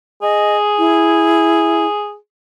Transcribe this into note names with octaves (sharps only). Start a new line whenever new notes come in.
G#4 D#5
E4